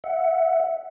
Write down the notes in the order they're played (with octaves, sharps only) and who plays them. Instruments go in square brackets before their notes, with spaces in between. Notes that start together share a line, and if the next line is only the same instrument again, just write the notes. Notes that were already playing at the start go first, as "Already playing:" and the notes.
[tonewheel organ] E5 F#5